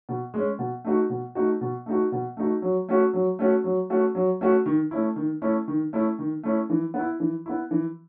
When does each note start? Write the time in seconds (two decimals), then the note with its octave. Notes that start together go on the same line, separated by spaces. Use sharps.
0.09 B2
0.34 G#3 C#4
0.59 B2
0.85 A3 D#4 F#4
1.10 B2
1.35 A3 D#4 F#4
1.61 B2
1.86 A3 D#4 F#4
2.12 B2
2.37 A3 D#4 F#4
2.62 F#3
2.89 A3 C#4 F#4
3.13 F#3
3.39 A3 C#4 F#4
3.64 F#3
3.90 A3 C#4 F#4
4.15 F#3
4.41 A3 C#4 F#4
4.66 D#3
4.91 A3 C#4 E4
5.16 D#3
5.42 A3 C#4 E4
5.68 D#3
5.93 A3 C#4 E4
6.19 D#3
6.43 A3 C#4 E4
6.70 E3
6.94 B3
6.99 E4
7.20 E3
7.46 B3 E4
7.71 E3